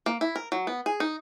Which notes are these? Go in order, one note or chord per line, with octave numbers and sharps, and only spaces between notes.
A#3
E4
A#4
F#3
B3
G#4
D#4